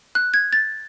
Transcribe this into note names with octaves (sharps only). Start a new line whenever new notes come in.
F#6
G#6
A6